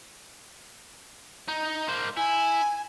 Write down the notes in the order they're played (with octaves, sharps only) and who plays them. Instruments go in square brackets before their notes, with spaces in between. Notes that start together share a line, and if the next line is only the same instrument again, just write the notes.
[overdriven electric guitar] D#4
A#3 C5
[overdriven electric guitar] E4 [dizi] G#5